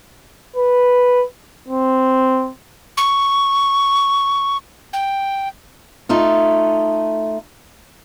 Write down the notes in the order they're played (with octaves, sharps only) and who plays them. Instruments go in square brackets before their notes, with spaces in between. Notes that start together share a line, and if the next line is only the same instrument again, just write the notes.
[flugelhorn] B4
C4
[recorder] C#6
G5
[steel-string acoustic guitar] A3 D#4 F4